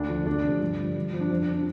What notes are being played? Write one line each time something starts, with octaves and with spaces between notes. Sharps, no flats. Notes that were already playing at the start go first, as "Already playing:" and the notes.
Already playing: D2 D4
D3 F3
D2 D4
C3 F3
G2
D3 F3
G2
F3
D4
F2 C4
D4
F3
D4